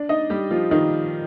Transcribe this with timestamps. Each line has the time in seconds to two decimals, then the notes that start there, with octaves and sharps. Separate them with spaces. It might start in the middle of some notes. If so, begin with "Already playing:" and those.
Already playing: D4 D5
0.09 D#4 D#5
0.30 G3 G4
0.51 F3 F4
0.71 D#3 D#4